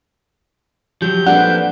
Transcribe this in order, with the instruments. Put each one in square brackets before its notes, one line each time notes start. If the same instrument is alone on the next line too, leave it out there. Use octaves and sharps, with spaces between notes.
[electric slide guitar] F3 F#3 [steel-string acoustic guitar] G4 [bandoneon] G6
[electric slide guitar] F3 A#3 C4 [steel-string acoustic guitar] D4 A4 B4 [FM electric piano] F#5